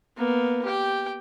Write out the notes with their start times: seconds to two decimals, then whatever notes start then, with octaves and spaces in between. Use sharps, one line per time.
0.17 A#3 B3
0.65 G4 G5